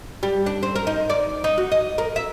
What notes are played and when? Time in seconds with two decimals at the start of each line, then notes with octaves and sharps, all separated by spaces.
0.23 G3
0.46 D4
0.63 C4
0.76 A#4
0.87 D#4
1.10 D5
1.44 D#4
1.58 F#4
1.72 D#5
1.98 A#4
2.16 E5